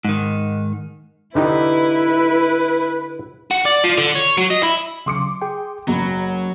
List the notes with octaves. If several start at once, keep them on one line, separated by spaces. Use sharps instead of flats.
G#2 D#3
D3 D#4 E4 G4 B4
F#4
D5
F3
D3
C#5
F#3
D#5
E4
C#3 F#3 C6 D6 C#7
G#4 G5
F#1 F#3 A#5 B5